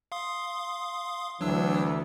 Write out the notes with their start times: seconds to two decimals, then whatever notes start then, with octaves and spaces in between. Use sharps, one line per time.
0.12 F5 C6 D#6
1.41 D2 E3 F#3 D4 E6